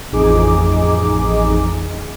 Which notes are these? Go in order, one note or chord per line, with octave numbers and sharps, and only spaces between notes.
A1 F2 D#4 G#4 D6